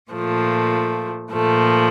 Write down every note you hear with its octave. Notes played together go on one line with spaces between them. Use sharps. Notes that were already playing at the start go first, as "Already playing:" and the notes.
A#2 F3 A3
A#2 F3 A3